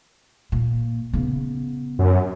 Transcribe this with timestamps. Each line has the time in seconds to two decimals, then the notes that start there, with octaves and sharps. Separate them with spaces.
0.52 A#2
1.13 C#3 B3
1.99 F#2